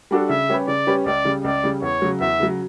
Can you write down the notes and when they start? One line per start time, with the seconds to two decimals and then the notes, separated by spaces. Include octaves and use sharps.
0.11 G3 D4 F#4 A4
0.29 C#3 E5
0.49 G3 C#4 G4 B4
0.68 C#3 D5
0.87 G3 C#4 G4 B4
1.06 C#2 D5
1.25 C#3 G3
1.44 C#2 D5
1.64 C#3 G3
1.82 E2 C#5
2.02 C#3 F#3
2.21 E2 E5
2.40 C#3 F#3